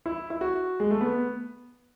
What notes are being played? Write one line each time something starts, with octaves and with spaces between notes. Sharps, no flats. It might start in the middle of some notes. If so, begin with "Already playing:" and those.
E4
E4
F#4
G#3
A3
B3